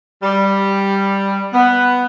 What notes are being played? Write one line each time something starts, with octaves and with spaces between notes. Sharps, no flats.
G3
B3